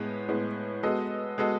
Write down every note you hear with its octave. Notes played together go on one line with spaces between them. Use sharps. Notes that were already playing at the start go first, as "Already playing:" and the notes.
Already playing: A2 G#3 B3
A2 G#3 B3
G#3 B3 F#4 A4 D#5
G#3 B3 F#4 A4 D#5